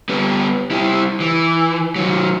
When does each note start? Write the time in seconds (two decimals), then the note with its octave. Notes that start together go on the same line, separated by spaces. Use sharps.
0.09 G3 B3
0.71 G3 E4
1.20 E3
1.96 D#3 F#3